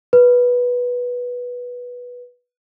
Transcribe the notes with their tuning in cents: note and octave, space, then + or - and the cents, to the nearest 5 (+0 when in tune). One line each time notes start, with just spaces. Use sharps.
B4 -10